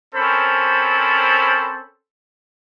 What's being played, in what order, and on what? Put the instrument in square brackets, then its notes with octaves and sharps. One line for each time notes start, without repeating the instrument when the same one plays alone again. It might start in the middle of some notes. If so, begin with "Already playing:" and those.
[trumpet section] C4 C#4 A4 A#4 C5 B5